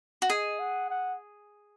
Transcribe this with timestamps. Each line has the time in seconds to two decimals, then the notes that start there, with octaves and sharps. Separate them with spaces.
0.22 F#4
0.29 G#4 D#5
0.59 F#5
0.90 F#5